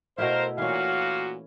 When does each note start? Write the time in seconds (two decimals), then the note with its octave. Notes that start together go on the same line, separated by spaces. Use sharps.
0.18 B2 A3 E4 A#4 C5 F5
0.58 A#2 E3 C#4 F#4 F5